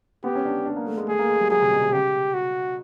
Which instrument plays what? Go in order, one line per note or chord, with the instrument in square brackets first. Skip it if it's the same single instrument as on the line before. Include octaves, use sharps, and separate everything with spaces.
[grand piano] B3 [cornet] G4
[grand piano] C#4
D4
D4
A#3
A3
G#3
[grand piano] A3 [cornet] G#4
[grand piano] A#3
G#3
G3
[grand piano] F#3 [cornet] G#4
[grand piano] C3
B2
C3
[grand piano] C#3 [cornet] G4
[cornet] F#4